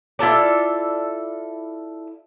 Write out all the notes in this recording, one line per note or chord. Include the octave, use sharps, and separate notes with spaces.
E4 F4 A4 D5